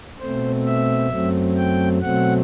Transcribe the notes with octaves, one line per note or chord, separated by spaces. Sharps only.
B2 A3 C4 C5
E5
F#2 F#3 A3 C4
G5
B2 F#3 A3 C4 F#5